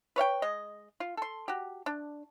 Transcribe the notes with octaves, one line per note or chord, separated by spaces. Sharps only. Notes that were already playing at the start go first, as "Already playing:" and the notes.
B4 C#5 F5 G5
G#3 D#5
F4
A4 C6
F#4 G4
D4